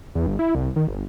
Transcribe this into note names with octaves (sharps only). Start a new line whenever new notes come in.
E2
G1
E4
C2
D#3
G1